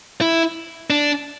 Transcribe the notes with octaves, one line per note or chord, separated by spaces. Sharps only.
E4
D4